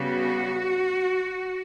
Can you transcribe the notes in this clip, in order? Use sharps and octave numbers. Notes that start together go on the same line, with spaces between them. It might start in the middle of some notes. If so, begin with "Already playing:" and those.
Already playing: C#3 G3 B3 F#4